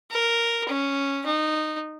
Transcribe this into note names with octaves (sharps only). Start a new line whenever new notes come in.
A#4
C#4
D#4